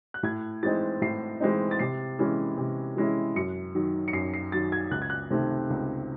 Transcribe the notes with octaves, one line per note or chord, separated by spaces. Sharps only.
F#6
A2 G#6
E3 G#3 C4 D#4 A6
A2 C7
E3 G#3 C4 D#4
A6
C3 C7
E3 G#3 C#4 E4
C3
E3 G#3 C#4 E4
F#2 C#7
D#3 F#3
C#7
F#2 C7
C7
D#3 F#3 A6
G#6
C#2 F#6
G#6
F#6
C3 D#3 A3 C4
C#2